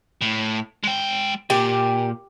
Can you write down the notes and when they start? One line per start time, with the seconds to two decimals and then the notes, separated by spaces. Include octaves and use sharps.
0.21 A2
0.83 G#3 G5
1.50 A#2 G4